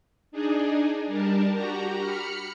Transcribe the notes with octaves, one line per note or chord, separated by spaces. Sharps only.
D4 D#4 G#4
G3 D4 A#4 A5
F#4 G4 A#5
B5 F6 C#7